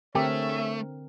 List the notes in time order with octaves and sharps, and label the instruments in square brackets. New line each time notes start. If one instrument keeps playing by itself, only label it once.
[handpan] D3 C4 A#4 [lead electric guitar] A3 [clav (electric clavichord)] G4 [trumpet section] G#4 C#5 E5